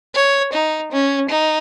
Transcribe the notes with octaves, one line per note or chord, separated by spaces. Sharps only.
C#5
D#4
C#4
D#4